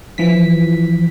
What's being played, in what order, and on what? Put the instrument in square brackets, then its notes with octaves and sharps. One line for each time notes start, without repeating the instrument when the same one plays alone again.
[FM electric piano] E3 F3 B6